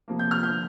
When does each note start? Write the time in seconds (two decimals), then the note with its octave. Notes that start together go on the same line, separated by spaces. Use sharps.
0.08 C3 F3 A#3
0.19 G6
0.31 F6
0.43 D3 F3 G6